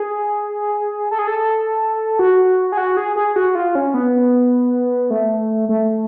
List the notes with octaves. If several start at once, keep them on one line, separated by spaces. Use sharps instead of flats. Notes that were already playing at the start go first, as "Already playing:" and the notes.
Already playing: G#4
A4
G#4
A4
F#4
G#4
F#4
G#4
G#4
F#4
F4
C#4
B3
A3
A3